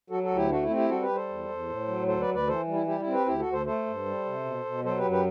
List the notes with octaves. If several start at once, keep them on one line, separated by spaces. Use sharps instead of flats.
F#3 F#4 A4
F#4 A4
D2
E4 G4
A3 D4 F#4
E4
C4
E4 G4
G3 F#4 A4
G4 B4
G3
A4 C5
E2
E2
A2
F#3
D2 A4 C5
B4 D5
D2
B4 D5
E3 A4 C5
G3
E4
G3 E4 G4
E4
C4
G4 B4
D2 E4 G4
F#4 A4
D2
A4 C5
A3 A4 C5
G2
G3
C3
B2
B2
F#3 A4 C5
G4 B4
F#2
G4 B4